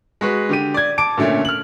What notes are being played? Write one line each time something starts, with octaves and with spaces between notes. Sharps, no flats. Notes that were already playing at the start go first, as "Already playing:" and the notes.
G#3 F#4 B4
D3 G4 D#7
D5 G#6
A5 D6 D7
A#2 D3 A3 A#3 C#4
F6 F#7